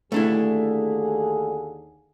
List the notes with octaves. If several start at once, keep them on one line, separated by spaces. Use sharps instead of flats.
D#2 D3 A3 D4 E4 G#4